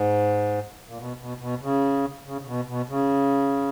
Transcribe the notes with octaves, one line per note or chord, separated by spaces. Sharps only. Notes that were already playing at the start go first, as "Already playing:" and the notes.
Already playing: G#2
A#2
B2
B2
B2
C#3
C#3
C#3
B2
B2
C#3